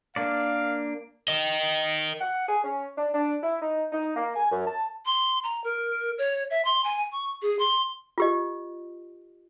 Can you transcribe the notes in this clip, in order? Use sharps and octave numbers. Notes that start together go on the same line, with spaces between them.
A#3 D4 D5 F5
A#4 D#5
F#5
G#4
C#4
D4
D4
E4
D#4
D#4
A#3
G#5
F#2
A5
C6
A#5
A#4
C#5
E5
C6
G#5
C#6
G#4
C6
F4 G4 D#5